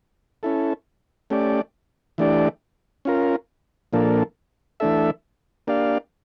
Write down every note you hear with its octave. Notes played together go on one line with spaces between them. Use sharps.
C#4 E4 A4
A3 C#4 G4 D5
E3 A3 D4 G4 D5
C#4 F4 A#4
A#2 F3 A#3 D4 A4
E3 A3 D4 A4 E5
A#3 D4 G4 D5 F5